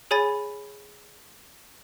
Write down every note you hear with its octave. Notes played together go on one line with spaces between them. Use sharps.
G#4 C#5 G#5 B5 A6